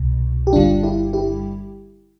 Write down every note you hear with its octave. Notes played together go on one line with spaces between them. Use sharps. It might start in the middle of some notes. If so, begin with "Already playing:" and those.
Already playing: C2 B2
G4
G1 G2 D3 G3 D4 F4
E4 G4
E4 G4